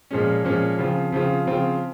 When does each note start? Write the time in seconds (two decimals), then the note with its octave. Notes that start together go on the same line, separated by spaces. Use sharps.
0.11 A#2 F3 G#3 C#4
0.45 A#2 F3 G#3 C#4
0.78 C#3 F3 C4 F4
1.12 C#3 F3 C4 F4
1.47 C#3 F3 C4 F4